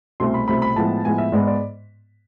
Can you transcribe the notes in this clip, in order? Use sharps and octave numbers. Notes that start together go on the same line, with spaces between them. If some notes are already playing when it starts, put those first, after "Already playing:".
C2 B2 A3 C4 C6
B5
C2 B2 A3 C4 B5
B5
A2 F3 G#3 B3 A5
A2 F3 G#3 B3 G#5
E5
G#2 G#3 B3 D5
D5